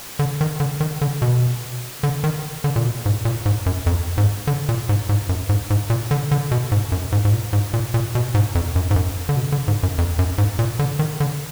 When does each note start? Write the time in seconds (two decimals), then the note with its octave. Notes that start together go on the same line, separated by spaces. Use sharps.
0.19 D3
0.41 D#3
0.60 D3
0.80 D#3
1.01 D3
1.22 B2
2.03 D3
2.24 D#3
2.64 D3
2.76 A#2
2.85 B2
3.06 G#2
3.25 A#2
3.46 G#2
3.66 F#2
3.86 F2
4.18 G#2
4.47 D3
4.69 A#2
4.89 G#2
5.09 G#2
5.29 F#2
5.49 G#2
5.70 G#2
5.90 A#2
6.11 D3
6.31 D3
6.51 B2
6.72 G#2
6.92 F#2
7.12 G#2
7.25 G#2
7.33 A#2
7.53 G#2
7.73 A#2
7.94 A#2
8.15 B2
8.34 G#2
8.55 F2
8.76 F#2
8.91 G#2
8.96 F#2
9.29 D3
9.37 B2
9.52 D3
9.68 G#2
9.83 F#2
9.98 F2
10.19 F#2
10.38 G#2
10.59 A#2
10.79 D3
10.99 D#3
11.20 D3